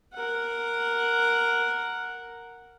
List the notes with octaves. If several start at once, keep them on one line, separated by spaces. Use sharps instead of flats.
A#4 F#5